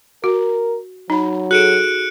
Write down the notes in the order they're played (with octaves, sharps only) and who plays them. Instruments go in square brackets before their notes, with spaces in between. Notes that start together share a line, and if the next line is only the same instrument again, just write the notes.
[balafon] F#4 [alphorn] A#4
[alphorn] F#3 [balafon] D#4 B5
[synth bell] F#4 G#4 A4 [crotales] F#6 C#7 D7